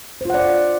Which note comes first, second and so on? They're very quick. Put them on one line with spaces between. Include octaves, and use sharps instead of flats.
C5 F4 F#5 D5